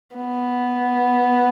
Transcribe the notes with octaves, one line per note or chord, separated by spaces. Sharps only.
B3